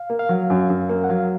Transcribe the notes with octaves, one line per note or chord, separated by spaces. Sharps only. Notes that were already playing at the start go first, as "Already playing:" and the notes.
Already playing: F5
A#3
F5
F#3
F#2
F#2
A#3
F#5
F#3 F5